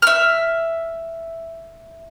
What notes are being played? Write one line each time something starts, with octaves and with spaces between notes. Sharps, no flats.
E5 F6